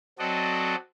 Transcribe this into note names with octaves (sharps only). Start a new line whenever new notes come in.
F#3 C4 F#4 A4 D5 D#5